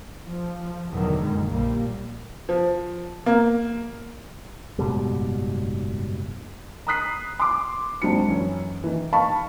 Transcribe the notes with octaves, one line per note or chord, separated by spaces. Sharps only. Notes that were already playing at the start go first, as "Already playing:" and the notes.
F3
E2 G#2 B2 D3 D#3 F#3
F#2 A#2 D#3 G#3
A#1 F3 G3 A#3
F3
A#3
F#1 G#2 B2 G3
A#5 B5 D#6 F#6 B6 C7
C6 D6
G#1 F#3 C4 D4 B5 C#7
F#2 E3 C#4
D#3 E3
D#5 F5 A5 B5 C#6